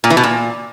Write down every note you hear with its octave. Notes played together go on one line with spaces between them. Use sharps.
A#2
E3
B2
A#2